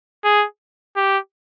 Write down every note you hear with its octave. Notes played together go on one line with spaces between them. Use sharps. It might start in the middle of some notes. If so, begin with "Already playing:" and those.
G#4
G4